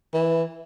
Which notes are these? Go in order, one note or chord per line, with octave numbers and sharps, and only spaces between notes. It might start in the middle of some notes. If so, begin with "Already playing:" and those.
E3